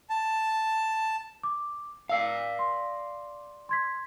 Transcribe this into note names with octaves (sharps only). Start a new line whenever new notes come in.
A5
D6
D5 F5 E6 C7
C6
C6 G#6 B6